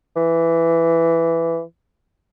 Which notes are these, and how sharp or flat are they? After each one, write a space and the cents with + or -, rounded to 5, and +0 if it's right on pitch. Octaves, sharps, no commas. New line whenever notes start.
E3 +10